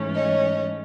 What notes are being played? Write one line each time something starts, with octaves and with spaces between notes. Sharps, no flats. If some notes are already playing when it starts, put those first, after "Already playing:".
Already playing: G#2 E3 A3 C#4
C#5 D#5